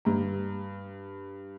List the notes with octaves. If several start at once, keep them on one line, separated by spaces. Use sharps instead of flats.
G2 A#5